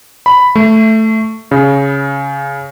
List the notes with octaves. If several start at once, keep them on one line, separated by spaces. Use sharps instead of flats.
B5
A3
C#3